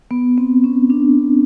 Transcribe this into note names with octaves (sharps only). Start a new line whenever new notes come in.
B3
C4
C#4
D4